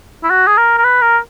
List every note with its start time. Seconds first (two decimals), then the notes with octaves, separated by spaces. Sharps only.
0.23 E4
0.30 F#4
0.47 G#4
0.57 A#4
0.78 A#4
0.84 B4
1.02 A#4